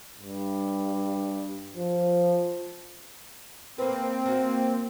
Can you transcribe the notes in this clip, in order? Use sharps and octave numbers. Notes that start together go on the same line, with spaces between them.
G2
F3
A#3 C4 B4
A#3 F#4